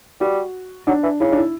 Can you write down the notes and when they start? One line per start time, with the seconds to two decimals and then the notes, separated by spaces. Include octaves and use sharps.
0.21 G3 F#4
0.87 F#3 D4
1.03 E3
1.20 C#3 E4
1.32 D4
1.37 E4